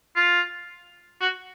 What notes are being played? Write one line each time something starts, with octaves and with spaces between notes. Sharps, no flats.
F4
F#4